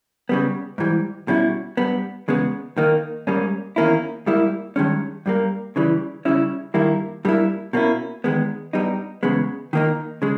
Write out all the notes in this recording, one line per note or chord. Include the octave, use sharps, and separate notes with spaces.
C#3 G3 B3
G#2 E3 G3
B2 G3 C#4 E4
G2 G3 B3
E2 C#3 G#3 B3
D#3 A#3 D#4
G#2 G3 A#3 C#4
E2 D#3 A#3 C#4 E4
G#2 G3 A#3 E4
G2 D#3 G#3 C#4
G2 G3 A#3
C#3 E3 G3
C#3 G3 C#4 E4
G2 D#3 G3 A#3 E4
G2 G3 A#3 E4
B2 A#3 C#4 E4
E2 D#3 G#3 B3
G2 G3 B3 D#4
E2 C#3 G#3 B3
D#3 A#3 D#4
C#3 G#3